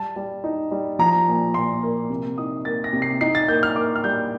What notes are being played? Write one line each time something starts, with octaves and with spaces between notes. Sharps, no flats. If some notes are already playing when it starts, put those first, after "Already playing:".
Already playing: G3 A5
G3
D#4
G3
F3 A#5
A#2
A#2 C6
A#3
C3
D#4 D#6
A#3 A6
A#6
C3
C7
D#4 C7
A6
A#3 G6
F6
A#3 D6
F6
G3 G6